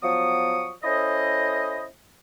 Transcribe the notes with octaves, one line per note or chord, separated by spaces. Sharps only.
F3 F#3 B3 C#6 D#6
C#4 E4 A4 C5 D#5